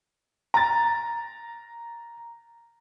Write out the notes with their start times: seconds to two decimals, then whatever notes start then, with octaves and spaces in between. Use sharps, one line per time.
0.54 A#5 A6